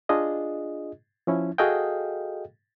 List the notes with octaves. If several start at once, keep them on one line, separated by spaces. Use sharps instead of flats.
D4 F4 G#4 D#5
F3 C#4 E4
F#4 G#4 A4 D#5 F5 G5